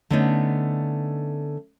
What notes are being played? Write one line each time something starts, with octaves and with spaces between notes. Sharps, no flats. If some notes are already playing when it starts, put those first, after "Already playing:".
D3 A3 B3 C#4 D#4